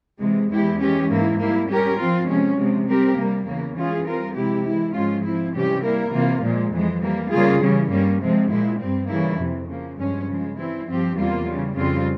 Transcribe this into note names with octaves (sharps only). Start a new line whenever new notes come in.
C3 E3 G#3
E2 E3 G#3 E4 G4
E3 G#3 C#4 G4
G#2 E3 A#3 E4
G3 A#3 E4
G3 C#4 G4 A#4
F3 C4 F4
C3 F3 G#3 C#4
C3 F3 G#3
G3 C4 G4 A#4
C3 G3 A#3
E2 C#3 E3 A#3
E3 G#3 C#4 F4 G#4
G3 C4 F4 A#4
C3 F3 G#3 E4 G4
E3 G#3 E4
G#2 F3 G#3 C#4 F4
F3 C4 E4
C3 E3 G3 C#4 G4
G3 A#3 E4 A#4
C3 E3 A#3 F4
A#2 F3 G#3
F2 E3 G#3
E3 G3 A#3
C#3 G3 A#3 F4 G#4
C#3 E3 G3 C#4
G2 G3 A#3 C#4
C3 F3 G#3 C4
A#2 F3 G#3 E4
G2 G3 C4
C#3 E3 G3 A#3 E4
F2 C3 E3
C#3 F3 A#3
G2 F3 G#3 C#4
C#3 F3 G#3
E3 G3 C4 E4
G2 F3 C4 G4
E2 C3 G3 A#3 F4
C#3 E3 G3
F2 C#3 G3 C4 F4